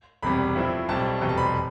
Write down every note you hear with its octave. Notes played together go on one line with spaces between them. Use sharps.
E1 E2 C3 G3 B5
A2 F3 C4 E4
B1 A2 G3 C4 A5
F1 E2 B2 G3 G5
A5
B5
C6